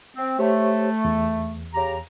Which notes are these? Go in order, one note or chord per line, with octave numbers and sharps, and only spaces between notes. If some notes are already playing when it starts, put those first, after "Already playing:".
C4
A3 G4 C5 C#5
E2
C#3 G4 A#5